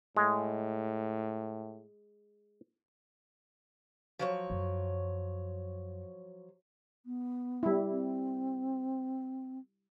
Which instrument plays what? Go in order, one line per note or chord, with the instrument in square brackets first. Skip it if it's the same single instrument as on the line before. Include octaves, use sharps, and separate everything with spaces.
[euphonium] A2 [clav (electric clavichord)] G#3
[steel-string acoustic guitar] F3 F#3 C#5
[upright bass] F#2
[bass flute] B3
[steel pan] G3 E4
[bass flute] C4